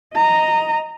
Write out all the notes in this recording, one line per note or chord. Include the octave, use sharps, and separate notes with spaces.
D#5 A#5